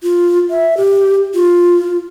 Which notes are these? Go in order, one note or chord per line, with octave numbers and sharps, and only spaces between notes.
F4
E5
G4
F4